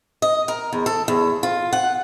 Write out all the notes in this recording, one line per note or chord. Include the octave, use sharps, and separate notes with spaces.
D#5
A#4
E2
A4
E2
F4
F#5